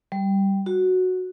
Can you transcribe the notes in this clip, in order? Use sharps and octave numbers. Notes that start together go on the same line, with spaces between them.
G3
F#4